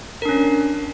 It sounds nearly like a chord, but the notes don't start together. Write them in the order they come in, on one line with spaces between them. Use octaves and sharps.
A#4 D4 C#4